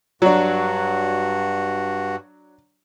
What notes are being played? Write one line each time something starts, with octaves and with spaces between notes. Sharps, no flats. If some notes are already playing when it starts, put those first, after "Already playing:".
G2 F#3 D4 F#4